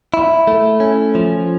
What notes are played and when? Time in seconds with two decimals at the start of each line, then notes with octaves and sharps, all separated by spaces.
0.14 E4
0.47 A3
0.80 C#4
1.15 F3